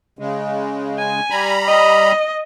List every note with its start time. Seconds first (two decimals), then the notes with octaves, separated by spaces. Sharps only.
0.19 C#3 G#3
0.98 G#5
1.30 G3 A#5 B5
1.67 D#5